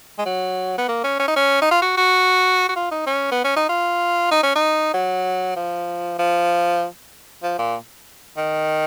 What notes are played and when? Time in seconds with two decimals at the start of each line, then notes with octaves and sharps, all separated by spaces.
0.18 G#3
0.26 F#3
0.78 B3
0.88 A#3
1.04 C#4
1.19 C#4
1.28 D#4
1.37 C#4
1.62 D#4
1.71 F4
1.82 F#4
1.97 F#4
2.69 F#4
2.76 F4
2.91 D#4
3.07 C#4
3.32 B3
3.45 C#4
3.56 D#4
3.69 F4
4.31 D#4
4.43 C#4
4.56 D#4
4.94 F#3
5.56 F3
6.19 F3
7.43 F3
7.59 A#2
8.38 D#3